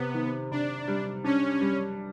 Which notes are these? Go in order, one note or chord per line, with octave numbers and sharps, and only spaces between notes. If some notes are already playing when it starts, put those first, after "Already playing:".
Already playing: C3 B3
D#3
C3 D4
G3
C#4 D4
G3